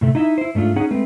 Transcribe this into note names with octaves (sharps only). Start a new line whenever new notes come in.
A2 C3 A3
D#4 E4 E5
E4 C5
G#2 A3 D4 F4
C#4 D#4 G#4 C#5 F#5
G#3 A3 C4 B4